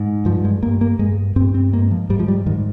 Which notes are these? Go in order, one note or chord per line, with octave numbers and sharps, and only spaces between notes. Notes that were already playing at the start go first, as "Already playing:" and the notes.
Already playing: G#2
G2 F3
G#3
G2 A#3
A#3
G2 G#3
G2 C4
C4
G#2 A#3
F3
G#2 G3
F3
G3
G#2 D#3